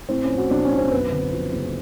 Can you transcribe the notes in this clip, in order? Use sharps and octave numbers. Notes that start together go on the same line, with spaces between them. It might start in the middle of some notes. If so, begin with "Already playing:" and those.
A2 C4
C#4
F3
F#4
B1 D4
C#4
B1
C4
F#2 B3
D3
F3
F#1